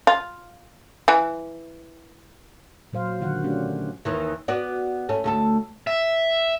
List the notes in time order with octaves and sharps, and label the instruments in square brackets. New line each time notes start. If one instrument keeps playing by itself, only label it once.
[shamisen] F4
E3
[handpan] A#2 F#3 C5 F5
D3 D#3 F#3 F4 F#4 F#5
A3 C#4 D4 G4
[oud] D#2 D#3 E3
B3 F#4 D5
A3 C#4
D2 A3 A4
[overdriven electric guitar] E5